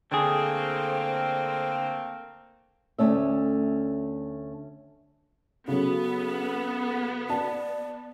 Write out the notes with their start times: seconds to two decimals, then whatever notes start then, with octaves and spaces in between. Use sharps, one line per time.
0.12 D3 A3 A#3 C4 G#4
2.99 D2 A3 C#4 E5
5.68 C#3 F#3 B3 A4
7.29 D5 A5